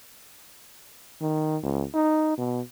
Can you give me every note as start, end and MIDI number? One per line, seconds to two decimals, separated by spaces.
1.21 1.57 51
1.63 1.85 37
1.94 2.34 63
2.38 2.61 47